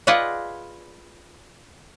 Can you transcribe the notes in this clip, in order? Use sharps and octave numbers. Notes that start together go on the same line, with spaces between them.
F4 G#4 B4 D5 D#5 F#5